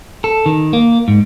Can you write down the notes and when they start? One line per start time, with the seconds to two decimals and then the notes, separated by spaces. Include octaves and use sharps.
0.24 A4
0.46 D#3
0.73 A#3
1.08 G#2